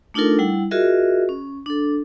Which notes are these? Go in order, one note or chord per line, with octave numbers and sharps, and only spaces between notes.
A3 D4 D#4 F4 A4 A#4
G3 E4 F#5
F4 F#4 G#4 A#4 D#5 E5
C#4
D4 A4